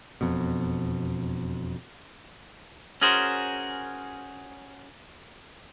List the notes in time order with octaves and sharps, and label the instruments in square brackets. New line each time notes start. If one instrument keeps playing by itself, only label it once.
[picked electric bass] E1 F2 B2
[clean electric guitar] C#4 F#4 G#4 A#4 C5